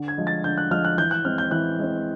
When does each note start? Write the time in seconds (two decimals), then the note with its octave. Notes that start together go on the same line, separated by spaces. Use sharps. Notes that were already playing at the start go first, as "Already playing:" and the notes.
Already playing: D3
0.08 G#6
0.17 F3 G#3
0.27 A6
0.44 D3 G6
0.58 F#6
0.71 F3 G#3 F6
0.85 F#6
0.98 E3 G6
1.11 F#6
1.24 G#3 C4 F6
1.38 G6
1.51 E3 F#6
1.78 G#3 C4